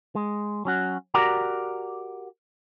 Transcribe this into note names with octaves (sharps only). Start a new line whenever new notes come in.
G#3
F#3 C#4 F#4
F#4 G4 A#4 D5 F#5 A#5